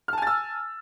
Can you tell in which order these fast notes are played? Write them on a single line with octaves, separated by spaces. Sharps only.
F6 A5 G#5 A6 E6